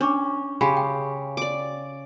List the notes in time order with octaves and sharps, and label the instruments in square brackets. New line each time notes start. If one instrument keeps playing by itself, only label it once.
[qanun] C#4 [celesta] D4 C#6 D6
[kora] C#3 [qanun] G4 [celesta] B5 C6
[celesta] G5
[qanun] D5 D6